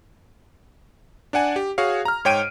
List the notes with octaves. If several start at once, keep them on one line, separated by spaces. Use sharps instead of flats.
D4 D5 F#5 G#5
G4
F#4 G#4 C#5 F5
A#5 F6
G#2 C#5 G5 D7 D#7